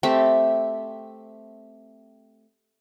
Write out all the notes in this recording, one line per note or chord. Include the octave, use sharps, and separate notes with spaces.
A3 C4 G4 E5